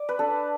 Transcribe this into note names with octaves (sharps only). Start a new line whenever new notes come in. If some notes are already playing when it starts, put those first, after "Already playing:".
Already playing: D5
B4
D4 A4